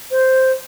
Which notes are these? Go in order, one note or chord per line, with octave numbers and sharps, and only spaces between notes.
C5